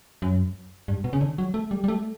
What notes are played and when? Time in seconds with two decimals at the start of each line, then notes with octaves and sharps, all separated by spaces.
0.22 F#2
0.88 G2
1.04 B2
1.13 C#3
1.21 D3
1.38 F#3
1.54 A3
1.71 G3
1.84 G3
1.88 A3